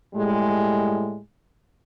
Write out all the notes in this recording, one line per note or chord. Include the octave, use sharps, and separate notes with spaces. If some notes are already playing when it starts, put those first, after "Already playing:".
A2 G3 G#3